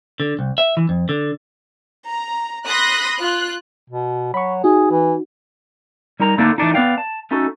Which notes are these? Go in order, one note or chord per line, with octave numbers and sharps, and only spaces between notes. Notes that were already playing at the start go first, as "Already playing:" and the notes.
D3
C2
E5
E3
F2
D3
A#5
B5 C6 D#6 F#6 A#6
F4 F#6
B2
F#3 B5 C#6
D#4 F#4 G#4
E3
G3 D#4 A#4 A#5
D3 A3 A#3 D4 D#4
E3 A3 D4 D#4
B3 B4 D5 F5 G5
A5
A3 C#4 D#4 F#4 A4